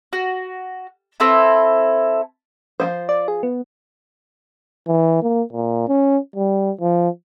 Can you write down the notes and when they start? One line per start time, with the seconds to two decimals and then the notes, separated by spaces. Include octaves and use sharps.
0.13 F#4
1.20 C4 E4 A4 B4
2.80 F3 A3 C5
3.09 D5
3.28 G#4
3.43 B3
4.87 E3
5.22 A#3
5.53 A#2
5.88 C#4
6.36 G3
6.81 F3